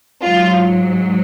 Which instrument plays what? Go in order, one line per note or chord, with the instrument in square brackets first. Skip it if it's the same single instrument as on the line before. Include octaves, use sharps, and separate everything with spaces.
[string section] G#2 F#3 F4